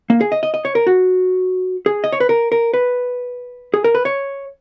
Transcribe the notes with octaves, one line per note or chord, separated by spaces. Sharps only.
A#3
G#4
D#5
D#5
D#5
C#5
A#4
F#4
G#4
D#5
C#5
B4
A#4
A#4
B4
G#4
A#4
B4
C#5